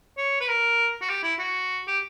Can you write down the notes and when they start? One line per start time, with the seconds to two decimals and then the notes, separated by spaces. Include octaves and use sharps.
0.18 C#5
0.41 B4
0.48 A#4
1.02 F#4
1.09 G4
1.23 E4
1.39 F#4
1.88 G4